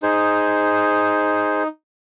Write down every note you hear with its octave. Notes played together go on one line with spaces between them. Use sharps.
D#4 G#4 C5